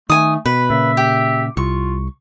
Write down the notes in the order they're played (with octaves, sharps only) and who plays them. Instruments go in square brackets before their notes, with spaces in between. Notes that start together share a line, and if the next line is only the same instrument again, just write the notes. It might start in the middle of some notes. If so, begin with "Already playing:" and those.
[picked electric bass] D#3 [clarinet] A3 [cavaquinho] G#5 D#6
[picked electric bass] B2 [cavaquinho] B4 [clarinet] B5
[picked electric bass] A#2 C#3 [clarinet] E5
[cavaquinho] G4
[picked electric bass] C2 [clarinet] F4 [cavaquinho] C#6